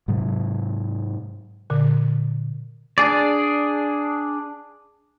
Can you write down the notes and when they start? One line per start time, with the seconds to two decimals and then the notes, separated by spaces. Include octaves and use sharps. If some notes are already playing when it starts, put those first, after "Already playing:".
0.08 G#2 C3 F#3
1.70 A#2 D3
2.98 D4 G#4 D5